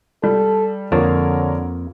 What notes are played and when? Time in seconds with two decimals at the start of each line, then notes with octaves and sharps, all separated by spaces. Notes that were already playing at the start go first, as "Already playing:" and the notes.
0.24 G3 A4
0.92 F2 D3 A#3 A#4 C#5 A5